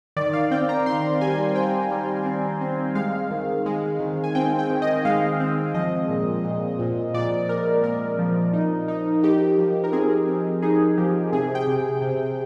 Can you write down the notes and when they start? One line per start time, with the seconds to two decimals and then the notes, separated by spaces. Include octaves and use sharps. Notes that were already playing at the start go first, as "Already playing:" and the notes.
0.17 D#3 D5
0.33 F5
0.51 C4 G5
0.69 A#5
0.86 D#3 C6
1.21 G3 G#5
1.56 C4 G5
1.91 G3
2.25 C4
2.61 C4
2.95 G#3 F5
3.31 D#3
3.66 G#3
4.00 D#3
4.24 G#5
4.35 C4 G5
4.59 G5
4.70 D#3
4.82 D#5
5.05 G#3 F5
5.40 C4
5.74 F3 D#5
6.09 A#2
6.44 A#2
6.79 A#2
7.14 A#2 D5
7.49 A#2 A#4
7.83 A#2 A#4
8.19 F3
8.53 D#4
8.88 D#4
9.23 D#4 G4
9.58 F3
9.84 A#4
9.92 C4 G#4
10.28 C4
10.62 D#4 G#4
10.98 F3 G4
11.32 C3 G#4
11.55 G5
11.67 C3
12.01 C3